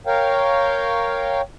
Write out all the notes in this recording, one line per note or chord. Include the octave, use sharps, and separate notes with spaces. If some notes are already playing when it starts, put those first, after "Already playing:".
A#4 C#5 F5 G5